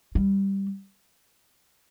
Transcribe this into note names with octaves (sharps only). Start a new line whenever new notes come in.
G3